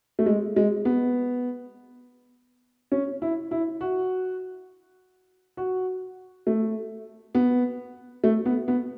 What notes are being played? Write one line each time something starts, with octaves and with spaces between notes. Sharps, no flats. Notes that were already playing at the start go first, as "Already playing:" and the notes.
A3
G#3
G#3
B3
C#4
E4
E4
F#4
F#4
A3
B3
A3
B3
B3